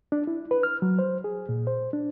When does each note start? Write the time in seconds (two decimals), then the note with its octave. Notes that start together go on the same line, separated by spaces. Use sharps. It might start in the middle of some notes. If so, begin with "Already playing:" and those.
0.12 D4
0.27 E4
0.51 B4
0.63 F6
0.82 F#3
0.99 C5
1.24 G#4
1.49 A#2
1.67 C5
1.93 D4